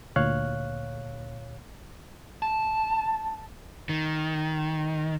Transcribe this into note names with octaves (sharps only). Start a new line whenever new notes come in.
D2 A#2 C#5 F5 F#6
A5
D#3